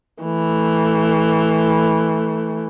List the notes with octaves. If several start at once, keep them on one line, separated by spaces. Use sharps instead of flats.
E3 A3